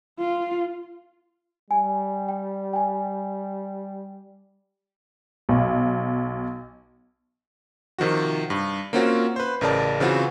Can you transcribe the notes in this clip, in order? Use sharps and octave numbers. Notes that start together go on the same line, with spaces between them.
F4
G3 G#5
G5
G5 G#5
B1
C3 D#3 F3 F#4
G2
A#3 C4 C#4 F4 F#4
B4 C5
A1 C#3 A#4 D5 A5
C#3 E3 C4 F4 F#4